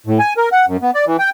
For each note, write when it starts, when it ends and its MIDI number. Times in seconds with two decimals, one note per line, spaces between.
0.07 0.19 45
0.19 0.33 80
0.37 0.49 70
0.52 0.66 78
0.67 0.77 42
0.82 0.91 59
0.95 1.05 74
1.06 1.17 52
1.19 1.30 79